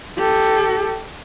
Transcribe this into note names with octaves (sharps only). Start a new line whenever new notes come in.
G4 A4